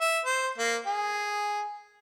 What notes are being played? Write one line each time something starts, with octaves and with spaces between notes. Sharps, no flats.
E5
C5
A#3
G#4